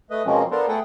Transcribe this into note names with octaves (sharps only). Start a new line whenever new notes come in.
A3 B4 D#5
B2 F3 G#3 A#3 C4 C#4
B3 D4 F4 A4 A#4 C5
A3 G#4 A4 B4 F#5 G5